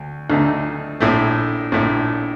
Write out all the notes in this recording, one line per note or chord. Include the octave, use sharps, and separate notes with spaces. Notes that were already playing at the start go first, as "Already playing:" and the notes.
Already playing: D2
D2 D3 A3 D#4
A#1 A2 A3
A#1 A2 A3